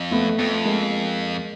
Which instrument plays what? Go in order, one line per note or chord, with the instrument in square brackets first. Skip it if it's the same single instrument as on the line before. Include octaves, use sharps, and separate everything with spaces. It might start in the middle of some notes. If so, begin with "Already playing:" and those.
Already playing: [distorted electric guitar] F2
[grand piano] A3 B3
[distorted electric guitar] F2 [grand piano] A3 B3
[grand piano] G#3 A#3